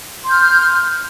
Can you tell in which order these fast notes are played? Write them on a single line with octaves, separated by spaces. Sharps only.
C6 G6 F6